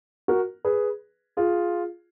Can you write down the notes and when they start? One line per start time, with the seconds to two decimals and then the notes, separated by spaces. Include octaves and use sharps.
0.28 F#4 A#4
0.65 G#4 B4
1.37 F4 G#4